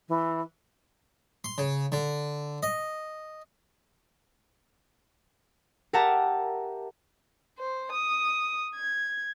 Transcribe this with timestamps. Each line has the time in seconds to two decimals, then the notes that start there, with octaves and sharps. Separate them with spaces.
0.09 E3
1.44 C6
1.58 C#3
1.92 D3
2.63 D#5
5.93 G4 A#4 E5 F#5 A5 A#5
7.58 C5
7.92 D#6
8.75 G#6